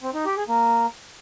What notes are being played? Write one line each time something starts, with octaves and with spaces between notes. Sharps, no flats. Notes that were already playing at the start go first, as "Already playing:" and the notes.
C4
D#4
G4
G#4
A#3